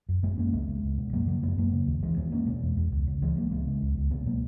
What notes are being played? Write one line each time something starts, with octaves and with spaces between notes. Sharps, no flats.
F#2
F#2 G#3 B3
F#2 A#3 C#4
C#2 G#3 B3
C#2
C#2
B2
F#2 F#3 A#3
C#3 F#3 A#3
F#2 G#3 B3
F#2 F#3 A#3
C#3
D#2
D#2 E3 G#3
D#2 G#3 B3
E2 A#3 C#4
B2 G#3 B3
E2
E2
C#2
C#3
C#2 E3 G#3
C#2 F#3 A#3
C#2 G#3 B3
C#3
C#2
C#2
B2 G#3 B3
B2 F#3 A#3